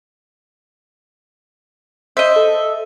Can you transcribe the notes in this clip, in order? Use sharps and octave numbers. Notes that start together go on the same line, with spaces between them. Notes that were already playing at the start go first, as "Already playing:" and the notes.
C5 D#5 E5
A4